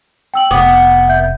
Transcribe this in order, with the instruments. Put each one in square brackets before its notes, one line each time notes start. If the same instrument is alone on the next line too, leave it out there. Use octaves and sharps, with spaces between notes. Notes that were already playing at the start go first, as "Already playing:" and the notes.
[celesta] G5 E6 F#7
[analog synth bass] F1 [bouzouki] B3 [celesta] D6 D#6
[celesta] E5 G6